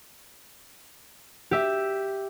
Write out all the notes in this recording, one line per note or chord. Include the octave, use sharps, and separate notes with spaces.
G4 E5